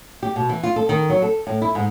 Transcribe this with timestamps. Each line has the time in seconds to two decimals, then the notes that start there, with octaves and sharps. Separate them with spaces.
0.23 G4
0.36 B2
0.49 E3
0.63 F4
0.76 A4
0.89 D#3
1.10 F#3
1.22 A4
1.47 A2
1.62 E4
1.75 G#2